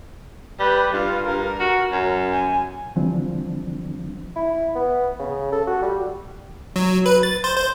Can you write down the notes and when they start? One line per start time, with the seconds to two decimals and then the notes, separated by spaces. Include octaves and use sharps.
0.60 G3 B4
0.93 G2 F4
1.26 G2 A#4
1.60 F#4
1.92 F#2
2.33 G#5
2.96 D3 E3 F3 G3 C4 D4
4.36 E4
4.75 B3
5.19 C#3
5.52 A4
5.67 F#4
5.82 G3
6.76 F#3
7.06 B4
7.23 A6
7.44 C5
7.57 C5